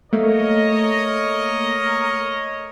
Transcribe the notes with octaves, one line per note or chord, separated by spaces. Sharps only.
A3 A#3 A#4 C#5 D#5